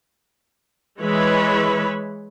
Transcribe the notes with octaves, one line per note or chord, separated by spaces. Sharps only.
E3 G#3 B4 C#5 E5 B5